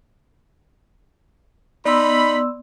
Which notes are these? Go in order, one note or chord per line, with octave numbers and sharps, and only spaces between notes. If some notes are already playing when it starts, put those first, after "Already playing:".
B3 D#4 D5 B5 C6 E6